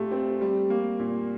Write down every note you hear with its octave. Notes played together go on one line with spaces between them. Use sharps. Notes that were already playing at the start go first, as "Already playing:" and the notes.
Already playing: A#2 A3 C4 F4 G4
C4
G3
A#3
A#2